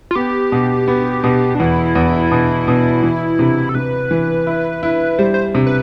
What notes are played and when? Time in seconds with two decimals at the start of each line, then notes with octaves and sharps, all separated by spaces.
0.11 F4
0.16 B3 G4
0.52 B2
0.88 B3
1.24 B2
1.55 D4
1.60 E2 E4
1.95 E2
2.31 B2
2.68 B2
3.03 E3
3.39 C3
3.69 A4
3.75 C3 B4
4.11 E3
4.47 E4
4.83 E4
5.19 G3 C5
5.34 C5
5.55 C3
5.67 B4